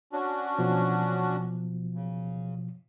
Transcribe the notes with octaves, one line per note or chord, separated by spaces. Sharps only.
C#4 D4 F#4
B2 F3
C#3